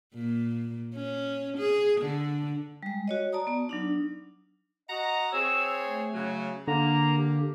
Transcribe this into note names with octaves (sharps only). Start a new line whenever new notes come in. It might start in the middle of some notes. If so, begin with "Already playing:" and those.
A#2
C#4
G#4
D3
G3 G#3
F#4 C#5 D#5
D5 A5 A#5 D#6
B3 D5
F#3 D4 D#4
F#4 D#5 F#5 A#5
C4 G#4 C#5 E6
A3
C#3 F#3
D3 A#3 A#5
G4